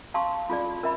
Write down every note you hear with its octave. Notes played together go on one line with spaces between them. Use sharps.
F5 A5 C6 C#6
F4 G#4 D5
A#4 E5 B5